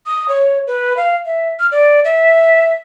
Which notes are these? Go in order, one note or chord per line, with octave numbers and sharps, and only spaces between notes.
D#6
C#5
B4
F5
E5
F6
D5
E5